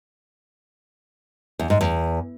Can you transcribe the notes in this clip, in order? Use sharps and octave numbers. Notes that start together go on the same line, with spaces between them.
E2
G#2
E2